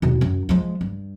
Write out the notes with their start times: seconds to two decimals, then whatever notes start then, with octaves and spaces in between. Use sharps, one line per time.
0.02 D#2 B2
0.21 F#2
0.49 F3 G#3
0.81 G2